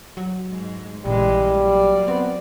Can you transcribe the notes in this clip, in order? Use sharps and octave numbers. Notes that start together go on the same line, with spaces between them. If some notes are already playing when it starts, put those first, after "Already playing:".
F#3
G#2 G#3
A#1 C#3 E3 G3 G#3
F#3 A#3 D5
B3 C4